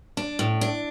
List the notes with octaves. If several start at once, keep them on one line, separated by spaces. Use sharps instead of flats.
D4
A2
D4